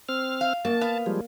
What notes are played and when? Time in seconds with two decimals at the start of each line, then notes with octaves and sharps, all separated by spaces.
0.09 C4 F6
0.41 F5
0.65 F#2 A#3 A5
0.81 B3 F5
1.06 F3 G3 G#3